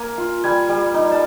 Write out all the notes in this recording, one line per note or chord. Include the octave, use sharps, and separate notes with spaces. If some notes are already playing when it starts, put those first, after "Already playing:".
Already playing: A#3 G#5
F4
G3 G#5
G3
D#4
A5